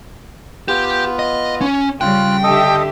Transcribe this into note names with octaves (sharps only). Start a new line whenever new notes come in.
B3 F4 G4
D#5
C#4
C#3 G3 F4 G5 F#6
D3 G4 A4 D#5 E5